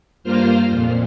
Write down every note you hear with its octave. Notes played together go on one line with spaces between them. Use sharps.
G2 A#3 F4 C5 F6
F2 A#2